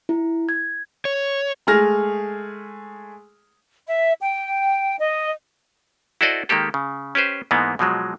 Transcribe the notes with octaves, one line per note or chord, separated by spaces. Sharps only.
E4
G#6
C#5
G#3 A3 G#4 F6 A#6
E5
G5
D#5
E4 F#4 A4 C5 D5 D#5
D#3 G#3 A#3 G4 A4
C#3
C#4 G4 B4 C5
G#2 E3 G#3 A#3 B3
B2 F3 F#3 G#3